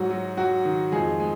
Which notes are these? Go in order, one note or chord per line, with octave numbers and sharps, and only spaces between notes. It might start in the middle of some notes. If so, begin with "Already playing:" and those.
Already playing: G#2 F#3 F#4
F#3
F#3 F#4
D#3
F2 G#3 G#4
G#3